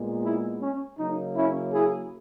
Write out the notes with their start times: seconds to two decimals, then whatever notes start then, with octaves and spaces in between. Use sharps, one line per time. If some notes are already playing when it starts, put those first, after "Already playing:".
Already playing: A#2 G#3 B3
0.25 E4 G#4
0.62 C#4
0.99 C#3 F#3 A#3 D#4
1.36 C#4 E4
1.73 E4 G#4